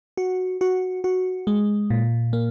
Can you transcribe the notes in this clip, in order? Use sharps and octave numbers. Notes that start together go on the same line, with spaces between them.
F#4
F#4
F#4
G#3
A#2
A#3